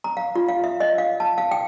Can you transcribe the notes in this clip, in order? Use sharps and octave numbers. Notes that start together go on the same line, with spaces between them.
A#5
F5
F4
F5
E5
D#5
F5
A5
F5
G5